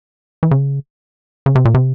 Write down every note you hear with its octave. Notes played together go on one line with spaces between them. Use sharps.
E3
C#3
C#3
C3
A#2
C3